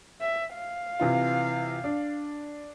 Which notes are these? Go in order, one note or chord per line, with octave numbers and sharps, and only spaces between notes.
E5
F5
C3 E3 F4
D4